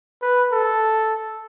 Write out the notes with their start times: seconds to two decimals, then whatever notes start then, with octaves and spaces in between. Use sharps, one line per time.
0.22 B4
0.52 A4